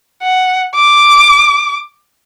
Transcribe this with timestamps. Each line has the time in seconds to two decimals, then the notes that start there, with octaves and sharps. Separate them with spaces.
0.23 F#5
0.75 D6